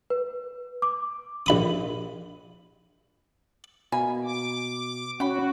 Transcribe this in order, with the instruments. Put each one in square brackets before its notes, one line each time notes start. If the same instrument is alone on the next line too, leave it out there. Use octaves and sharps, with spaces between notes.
[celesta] B4
D6
[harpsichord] A#1 B5 D#6
[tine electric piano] B2 [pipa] A#3 G#5 B5
[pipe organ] D6
[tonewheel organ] C#4 [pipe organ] F#4 [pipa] F#5 G5 B5